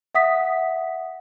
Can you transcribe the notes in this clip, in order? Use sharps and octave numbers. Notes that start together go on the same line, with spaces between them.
E5 F#5 D#6 B6